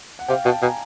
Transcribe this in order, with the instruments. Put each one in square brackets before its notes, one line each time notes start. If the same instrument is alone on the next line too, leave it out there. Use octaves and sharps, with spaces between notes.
[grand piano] F#5
[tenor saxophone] C3 [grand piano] F5 G5
[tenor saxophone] B2 [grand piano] G5 A5
[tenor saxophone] B2 [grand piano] G#5 A#5